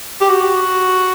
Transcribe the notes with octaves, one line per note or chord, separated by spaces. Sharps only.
G4
F#4